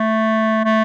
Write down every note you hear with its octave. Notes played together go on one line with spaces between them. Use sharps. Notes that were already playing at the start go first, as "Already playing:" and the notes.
Already playing: A3
A3